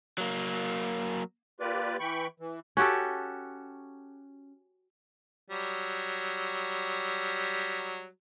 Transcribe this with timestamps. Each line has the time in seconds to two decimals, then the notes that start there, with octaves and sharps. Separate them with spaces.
0.18 F#3 A#3
1.60 A#3 F4 G4 B4 D5
2.00 E3 G5 B5 C#6
2.40 E3
2.77 C#4 F#4 G4 A4
5.50 F#3 G3